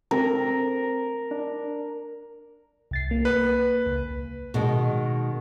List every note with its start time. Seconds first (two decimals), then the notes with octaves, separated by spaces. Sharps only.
0.11 C4 A#4
1.31 D4
2.91 C2 A6 C7
3.11 A#3
3.25 B4
3.86 C#2
4.54 B2 D#3 G#3